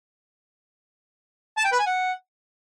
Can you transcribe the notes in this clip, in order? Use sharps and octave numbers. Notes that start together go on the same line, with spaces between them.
A5
G5
B4
G#5
F#5